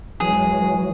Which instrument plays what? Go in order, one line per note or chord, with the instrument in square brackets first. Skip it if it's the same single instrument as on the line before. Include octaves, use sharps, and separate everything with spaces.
[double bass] F#2 G#3 [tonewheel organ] E3 F#3 [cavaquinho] G#4